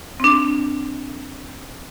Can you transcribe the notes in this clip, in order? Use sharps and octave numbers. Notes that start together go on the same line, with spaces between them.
C4 D4